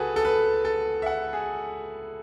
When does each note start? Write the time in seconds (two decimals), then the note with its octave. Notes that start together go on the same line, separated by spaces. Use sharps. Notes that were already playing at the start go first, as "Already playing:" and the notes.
Already playing: C#2 F#4 G#4 A4 B4
0.16 A4
0.25 B4
0.65 A4
1.02 E5
1.06 F#5
1.33 G#4